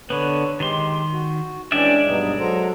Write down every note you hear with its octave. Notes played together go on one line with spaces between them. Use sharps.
D3 B3 B4 C#5
D#3 G#3 G4 C6
F#4
E3 G#3 C#4 D4 D5 E5 G5
G2 B2 F#3 D#4
F#3 A4 C5 A#5